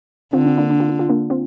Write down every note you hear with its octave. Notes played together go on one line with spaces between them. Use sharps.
D3 C4 F4
C4
A#3 D4
D4
F4
D4
F4
A#3 D4
C4 F4